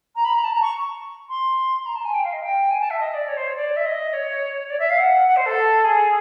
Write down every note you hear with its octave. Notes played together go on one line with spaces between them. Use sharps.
A#5
B5
A#5
A5
A#5
C#6
C6
A#5
A5
G#5
G5
F5
D#5
G5
G#5
A5
E5
D#5
D5
C#5
C5
C#5
D5
E5
D#5
C#5
D5
E5
F5
F#5
F#5
C5
A4
G#4